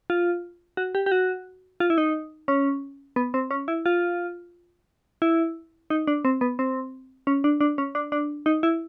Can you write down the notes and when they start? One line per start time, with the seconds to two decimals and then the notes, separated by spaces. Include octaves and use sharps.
0.10 F4
0.77 F#4
0.95 G4
1.06 G4
1.12 F#4
1.80 F4
1.90 E4
1.98 D#4
2.48 C#4
3.16 B3
3.34 C4
3.51 C#4
3.68 E4
3.86 F4
5.22 E4
5.90 D#4
6.07 D4
6.25 C4
6.41 B3
6.59 C4
7.27 C#4
7.44 D4
7.61 D4
7.78 C#4
7.95 D4
8.12 D4
8.46 D#4
8.63 E4